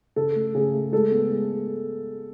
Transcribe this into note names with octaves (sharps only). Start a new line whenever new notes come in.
C#3 A4
A3
C#3 G#4
A3
G#3 A4
B3
G#3